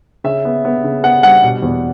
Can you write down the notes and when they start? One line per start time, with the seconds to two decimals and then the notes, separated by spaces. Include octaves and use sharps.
0.24 C#3 E5
0.45 B3
0.65 B3
0.84 C#3
1.04 B3 F#5
1.23 G3 F#5
1.44 B2
1.62 E2